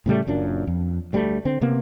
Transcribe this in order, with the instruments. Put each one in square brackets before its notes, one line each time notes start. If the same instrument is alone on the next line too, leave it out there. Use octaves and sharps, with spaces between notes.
[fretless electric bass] A2 C#3 G3 A3
F#1 F#2 A#2 D4
F2
D2 G3 A3
D3 C4
C3 A#3 B3